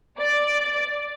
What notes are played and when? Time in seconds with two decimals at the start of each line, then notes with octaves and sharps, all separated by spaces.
0.19 D5